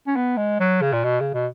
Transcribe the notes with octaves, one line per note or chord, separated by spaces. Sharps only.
C#4
B3
G#3
F#3
C#3
A#2
B2
C#3
B2